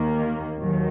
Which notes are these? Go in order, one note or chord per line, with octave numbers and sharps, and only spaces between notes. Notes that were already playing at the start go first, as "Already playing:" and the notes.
Already playing: D#2 D#3 A#3
D#2 D#3 F#3